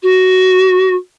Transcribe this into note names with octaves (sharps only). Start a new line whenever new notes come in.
F#4